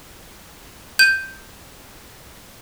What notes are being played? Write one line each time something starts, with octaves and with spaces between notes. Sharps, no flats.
G6 D#7